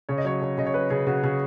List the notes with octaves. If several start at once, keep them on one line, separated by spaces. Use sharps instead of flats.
C#3 C#5
D#5
F#3 C#5
C#3
C#3 D#5
C#5
F#3 B4
C#3 G#4
C#3 F#4
C#3 G#4